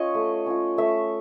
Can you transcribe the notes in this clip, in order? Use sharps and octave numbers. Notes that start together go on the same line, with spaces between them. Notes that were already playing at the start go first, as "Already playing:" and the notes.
Already playing: C#4 F4 C#5 D#5
A3
C#4 F4
A3 E5